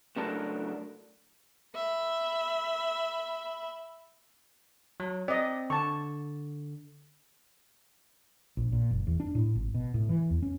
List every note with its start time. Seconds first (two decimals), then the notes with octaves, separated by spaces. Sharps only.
0.16 C#2 F#3 A3 D4 A#4 A5
1.75 E5 B5
5.00 F#3
5.28 C4 D5 D#5
5.70 D3 A5 C#6
8.57 A#1
8.72 A#2
8.91 F#1
9.07 E2
9.20 D4
9.35 A2
9.55 G#1
9.74 B2
9.94 A2
10.09 E3
10.30 E2
10.43 C#4